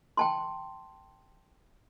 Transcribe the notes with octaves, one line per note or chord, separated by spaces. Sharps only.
G5 A5 C6